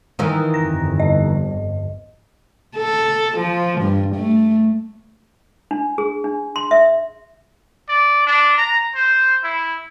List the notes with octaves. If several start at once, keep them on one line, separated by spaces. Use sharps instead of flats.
D#3 E3 D#4
G1 F2 A#6
D#5
A4
F3
G2
A3
D4
G#4
D4
C6
E5
D5
D4
A#5
C5
E4